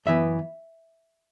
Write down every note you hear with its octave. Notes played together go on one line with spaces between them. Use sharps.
F#2 E3 B3 E5